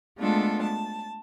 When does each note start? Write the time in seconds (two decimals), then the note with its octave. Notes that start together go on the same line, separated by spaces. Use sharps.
0.18 G#3 A3 B3 D4 F4 A4
0.62 A5